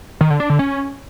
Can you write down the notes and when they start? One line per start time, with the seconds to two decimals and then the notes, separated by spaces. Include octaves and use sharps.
0.21 D#3
0.30 D3
0.40 D4
0.50 D3
0.59 C#4